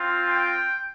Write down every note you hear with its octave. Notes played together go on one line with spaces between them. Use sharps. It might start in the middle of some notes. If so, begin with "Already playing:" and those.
Already playing: C4 F4
G5